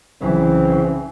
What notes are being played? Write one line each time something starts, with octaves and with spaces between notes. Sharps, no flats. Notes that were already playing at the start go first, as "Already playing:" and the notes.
C2 C#3 E3 F#3 C4